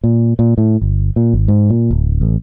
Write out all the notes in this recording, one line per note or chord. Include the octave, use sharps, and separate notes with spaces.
A#2
A#2
A2
G1
A#2
G#1
G#2
A#2
D1
A1